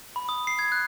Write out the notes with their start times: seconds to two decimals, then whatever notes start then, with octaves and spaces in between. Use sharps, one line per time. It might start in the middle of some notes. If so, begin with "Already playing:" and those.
0.16 B5
0.29 D#6
0.47 C7
0.59 G#6
0.72 F#6